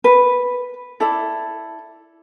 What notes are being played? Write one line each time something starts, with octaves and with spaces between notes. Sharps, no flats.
B4
E4 A4 D5